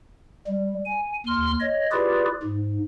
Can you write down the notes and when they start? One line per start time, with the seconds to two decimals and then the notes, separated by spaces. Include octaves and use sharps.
0.47 G3
0.85 G#5
1.27 D#2 C6 F6
1.60 C#5 D#5
1.92 E4 F4 G4 G#4 B4 D5
2.43 G#2